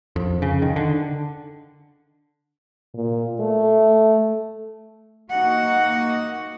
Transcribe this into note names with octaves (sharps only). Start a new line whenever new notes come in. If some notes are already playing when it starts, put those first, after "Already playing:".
F2
C#3
D#3
D3
A#2
A3
A#3 D#4 F#4 F#5